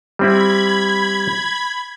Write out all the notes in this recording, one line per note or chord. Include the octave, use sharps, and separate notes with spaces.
G3 C4 E4 B5 G#6